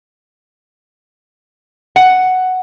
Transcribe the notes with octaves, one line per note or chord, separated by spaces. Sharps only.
F#5